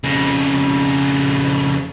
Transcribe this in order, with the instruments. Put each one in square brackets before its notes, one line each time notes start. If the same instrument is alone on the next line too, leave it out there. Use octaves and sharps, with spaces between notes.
[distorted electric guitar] F2 C#3